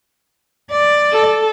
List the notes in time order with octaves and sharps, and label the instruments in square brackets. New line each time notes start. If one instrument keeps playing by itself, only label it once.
[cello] D5
[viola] A4